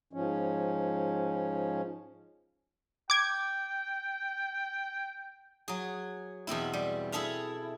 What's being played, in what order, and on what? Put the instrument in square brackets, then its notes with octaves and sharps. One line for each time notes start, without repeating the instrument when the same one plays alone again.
[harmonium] G#2 F3 C#4
[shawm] G5 [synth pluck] D6 G#6
[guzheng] F#3 G#4
E2 B2 C4 E4
G3
E4 G#4 A4 E5 F5